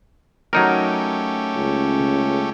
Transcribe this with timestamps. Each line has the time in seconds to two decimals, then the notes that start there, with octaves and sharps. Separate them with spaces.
0.53 F#3 A3 C#4 D#4 G4 A#4
1.56 C#2